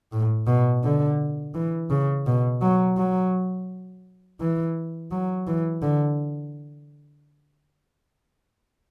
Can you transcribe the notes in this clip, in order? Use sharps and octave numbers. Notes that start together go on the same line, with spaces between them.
A2
B2
D3
E3
C#3
B2
F#3
F#3
E3
F#3
E3
D3